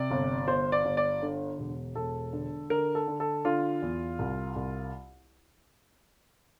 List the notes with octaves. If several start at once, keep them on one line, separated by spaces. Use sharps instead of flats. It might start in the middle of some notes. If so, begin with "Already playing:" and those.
Already playing: C3 D5
G1
G1 C5
D5
G1
D5
D3
E1
E1 A4
D3
D3 A#4
A4
D3
A4
D3 F4
E2
C2
C2